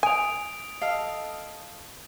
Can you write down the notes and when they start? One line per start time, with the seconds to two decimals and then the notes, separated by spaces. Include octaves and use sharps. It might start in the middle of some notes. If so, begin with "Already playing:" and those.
0.03 G#5 D#6 D7 F7
0.82 A4 D#5 F5